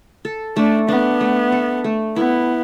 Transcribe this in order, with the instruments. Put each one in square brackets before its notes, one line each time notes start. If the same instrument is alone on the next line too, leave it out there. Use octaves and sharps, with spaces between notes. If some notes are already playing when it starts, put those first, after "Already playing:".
[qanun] A4
[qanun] A3 [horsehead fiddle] D4
[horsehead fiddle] B3 [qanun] D4
[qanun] A3
A4
A3
[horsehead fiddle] B3 [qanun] E4